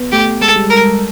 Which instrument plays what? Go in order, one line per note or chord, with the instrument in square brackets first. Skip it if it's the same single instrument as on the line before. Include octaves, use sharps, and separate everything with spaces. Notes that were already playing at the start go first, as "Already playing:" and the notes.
Already playing: [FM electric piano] B3
[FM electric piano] A3 [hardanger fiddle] G4
[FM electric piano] G#3 [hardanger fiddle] A4
[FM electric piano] G3
[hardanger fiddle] A#4